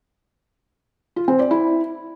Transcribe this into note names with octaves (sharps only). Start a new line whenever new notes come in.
F4
C4
D5
E4